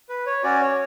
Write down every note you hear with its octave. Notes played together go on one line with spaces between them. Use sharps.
B4
C#5
C#4 F#4 D5
C#5